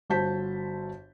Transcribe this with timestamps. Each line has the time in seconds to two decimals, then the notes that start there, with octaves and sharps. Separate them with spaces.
0.10 G1 F#4 C5 A5 G6 B6